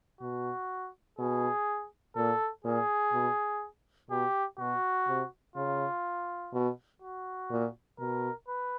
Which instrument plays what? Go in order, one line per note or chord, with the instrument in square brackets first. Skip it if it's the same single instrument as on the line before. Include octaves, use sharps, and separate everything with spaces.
[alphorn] B2 [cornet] F#4
[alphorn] B2 [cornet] G#4
[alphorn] A#2 [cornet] A4
[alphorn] A#2 [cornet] G#4
[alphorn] B2
[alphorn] B2 [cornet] G4
[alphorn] B2 [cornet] F#4
[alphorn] C3
[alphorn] C#3 [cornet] F4
[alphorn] B2
[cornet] F#4
[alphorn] A#2
[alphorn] B2 [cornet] A#4
[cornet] B4